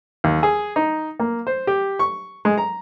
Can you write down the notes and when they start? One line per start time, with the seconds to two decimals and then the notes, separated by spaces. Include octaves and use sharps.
0.24 D#2
0.43 G#4
0.76 D#4
1.19 A#3
1.47 C5
1.67 G4
1.99 C#6
2.45 G#3
2.58 A#5